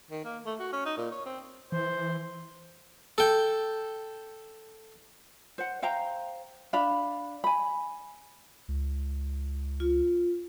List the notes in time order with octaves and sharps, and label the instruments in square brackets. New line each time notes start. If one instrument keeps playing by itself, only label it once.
[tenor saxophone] D#3
A#3
A3
F#4
C#4
D#4
A#2
C#5
C4
[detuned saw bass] E3 [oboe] C5
[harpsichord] A4 G5
[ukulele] C5 F#5
C5 F5 G5 A#5
D4 F5 B5
G#5 B5
[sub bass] C#2
[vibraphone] F4